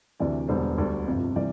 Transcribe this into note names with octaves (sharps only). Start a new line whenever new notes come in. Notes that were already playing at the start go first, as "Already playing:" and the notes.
D2 C3 E3 D5
E1 E2 D3 G3 C5
D2 D3 G3
G1 F2 C3
C3 E3 G3 D5